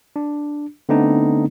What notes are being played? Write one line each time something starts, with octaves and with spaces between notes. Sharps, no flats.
D4
D3 A3 B3 C4 D4 D#4